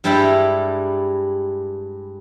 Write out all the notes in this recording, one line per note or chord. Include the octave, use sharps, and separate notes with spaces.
G2 G3 G#3 E4 G5 B5